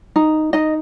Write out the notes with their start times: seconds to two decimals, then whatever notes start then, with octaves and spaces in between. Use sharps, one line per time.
0.16 D#4
0.53 D#4 D#5